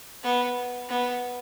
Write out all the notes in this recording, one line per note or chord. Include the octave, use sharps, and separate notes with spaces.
B3
B3